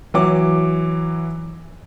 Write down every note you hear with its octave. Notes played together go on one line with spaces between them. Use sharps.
E3 F#3 D6